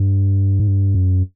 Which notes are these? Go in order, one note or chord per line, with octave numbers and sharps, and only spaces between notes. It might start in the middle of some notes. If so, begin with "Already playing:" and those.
Already playing: G2
G#2
G2
F#2